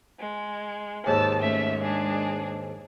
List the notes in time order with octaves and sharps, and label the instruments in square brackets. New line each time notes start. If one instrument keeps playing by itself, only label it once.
[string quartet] G#3
[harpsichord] D#2 G#2 [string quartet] A5 E6
[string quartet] A3 C#4 E5
G#3 D4 G#4